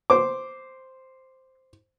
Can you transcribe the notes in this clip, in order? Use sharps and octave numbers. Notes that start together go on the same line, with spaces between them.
C5 D6